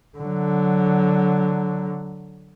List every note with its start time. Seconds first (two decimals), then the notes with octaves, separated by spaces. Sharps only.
0.18 D3 F#3